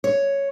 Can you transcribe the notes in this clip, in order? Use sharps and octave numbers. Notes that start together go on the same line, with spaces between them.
C#5